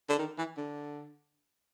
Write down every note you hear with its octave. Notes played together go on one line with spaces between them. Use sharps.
D3
D#3
E3
D3